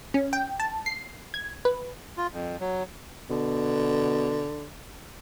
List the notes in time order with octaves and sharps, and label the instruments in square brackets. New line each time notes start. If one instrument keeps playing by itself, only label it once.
[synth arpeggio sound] C#4
G5
A5
C7
G#6
B4
[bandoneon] F4
F2
F#3
[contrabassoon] B2 [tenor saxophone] D3